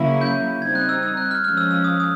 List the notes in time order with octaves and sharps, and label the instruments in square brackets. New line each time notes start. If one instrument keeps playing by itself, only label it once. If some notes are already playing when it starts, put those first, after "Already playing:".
Already playing: [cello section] C#3 F#3 A#3 C#4 E4
[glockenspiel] G6
[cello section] G3 C4 D#4 [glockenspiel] G#6
[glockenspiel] F#6
E6
E6
F#6
F6
[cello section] F3 G#3 C#4 [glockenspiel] F6
[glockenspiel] E6
E6
D#6
D#6